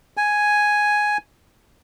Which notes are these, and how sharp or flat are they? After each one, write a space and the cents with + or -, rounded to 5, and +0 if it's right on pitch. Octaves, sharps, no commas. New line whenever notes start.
G#5 +5